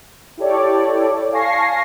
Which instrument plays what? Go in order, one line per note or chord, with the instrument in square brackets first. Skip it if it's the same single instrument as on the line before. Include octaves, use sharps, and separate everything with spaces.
[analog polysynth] E4 G4 A4 C#5 D5
F5 G#5 A5 C#6 A#6 C7